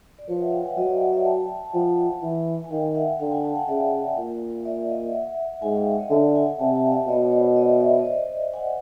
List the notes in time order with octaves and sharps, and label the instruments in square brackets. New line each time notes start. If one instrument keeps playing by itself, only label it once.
[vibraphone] D5
[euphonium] F3 [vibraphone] B4 C#5
[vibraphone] E5 F#5
F5 G5
F#5 G#5
[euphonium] F#3 [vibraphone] D#5 F5
[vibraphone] D5 E5
D5 E5
D5 E5
G5 A5
A5
[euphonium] F3 [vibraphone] F#5 G#5
[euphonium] E3
[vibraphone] G#5
[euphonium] D#3 [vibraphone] F5 G5
[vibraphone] E5 F#5
[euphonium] D3 [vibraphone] F5 G5
[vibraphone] F#5 G#5
G5 A5
F#5 G#5
[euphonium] C#3 [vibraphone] D5 E5
[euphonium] A#2
[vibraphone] D5 E5
D#5 F5
E5 F#5
[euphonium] G#2 [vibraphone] F#5 G#5
[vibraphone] F5 G5
E5 F#5
C#5 D#5
[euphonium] D3 [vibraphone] D5 E5
[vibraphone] F#5 G#5
[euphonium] C3 [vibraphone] G5 A5
[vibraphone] G5 A5
F5
D5 E5
[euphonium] B2 [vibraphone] C#5 D#5
[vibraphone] C#5
C5 D5
C#5 D#5
D5 E5
D5 E5
D5 E5
D#5
C5 D5
F#5 G#5